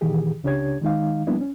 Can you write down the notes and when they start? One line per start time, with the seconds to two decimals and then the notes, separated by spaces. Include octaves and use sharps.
0.01 A#2 D#3 E3 G4 G#4
0.43 C#2 C#3 D4 G4 C#5 G#6
0.82 D#3 G#3 D#4 F5
1.27 F3 G3 A#3 B3 D4 E4
1.41 C#4